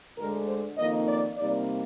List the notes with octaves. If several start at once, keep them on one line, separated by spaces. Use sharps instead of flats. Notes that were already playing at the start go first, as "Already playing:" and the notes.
D2 D3 G#3 A#4
C5
F2 D#3 A#3 D#4 D#5
D5
C3 G3 A#3 D#4 D5